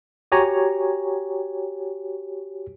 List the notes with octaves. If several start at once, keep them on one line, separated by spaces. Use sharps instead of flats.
F#4 G4 C#5 G#5 A#5